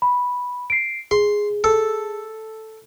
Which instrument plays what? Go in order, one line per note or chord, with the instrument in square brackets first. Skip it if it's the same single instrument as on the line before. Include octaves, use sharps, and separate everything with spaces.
[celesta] B5
C7 D7
[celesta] G#4 [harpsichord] C6
[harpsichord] A4